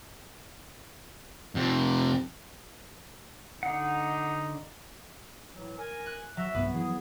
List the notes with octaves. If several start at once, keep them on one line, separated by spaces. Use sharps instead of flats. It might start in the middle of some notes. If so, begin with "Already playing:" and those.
F2 C3
D3 D#4 F#5
A2 E3 F#3
A#4 G#5
F#6
F#3 E5
B1 G2 B3
E3 F3 G#4